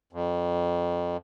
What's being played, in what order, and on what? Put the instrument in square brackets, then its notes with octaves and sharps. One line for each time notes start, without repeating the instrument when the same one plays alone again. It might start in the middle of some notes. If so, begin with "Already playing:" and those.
[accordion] F2